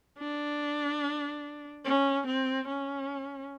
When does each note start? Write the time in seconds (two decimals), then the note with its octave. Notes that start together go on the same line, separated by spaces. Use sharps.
0.19 D4
1.85 C#4
2.27 C4
2.68 C#4